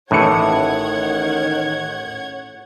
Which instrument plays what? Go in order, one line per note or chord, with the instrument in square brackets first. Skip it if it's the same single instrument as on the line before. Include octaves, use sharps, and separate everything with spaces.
[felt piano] A1 C#7 [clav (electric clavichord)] A2 E3 [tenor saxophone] D#3 [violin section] C#5 F#5 G#6